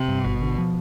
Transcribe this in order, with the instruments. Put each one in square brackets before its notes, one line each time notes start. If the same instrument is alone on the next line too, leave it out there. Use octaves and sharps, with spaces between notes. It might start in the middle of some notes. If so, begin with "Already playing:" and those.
Already playing: [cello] C3
[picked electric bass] G2
[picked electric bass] G#1 [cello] B2
[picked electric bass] D3
F3